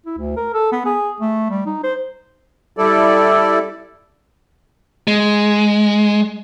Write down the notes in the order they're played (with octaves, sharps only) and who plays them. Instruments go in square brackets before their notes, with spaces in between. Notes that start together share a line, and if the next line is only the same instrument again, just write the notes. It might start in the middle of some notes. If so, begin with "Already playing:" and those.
[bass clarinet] E4
D2
A#4
A4
B3
G#4
A3
G3
D#4
C5
[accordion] G3 E4 A4 D5
[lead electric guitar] G#3